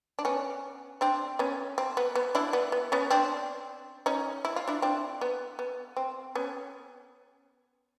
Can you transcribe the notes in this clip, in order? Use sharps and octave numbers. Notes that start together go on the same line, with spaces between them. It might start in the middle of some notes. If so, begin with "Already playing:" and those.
D4
B3 C#4
C4 D4
B3 C#4
C4
B3
B3
D4 E4
B3
B3
B3 C#4
C4 D4
C#4 D#4
E4
F4
D4 E4
C4 D4
B3
B3
C4
B3 C#4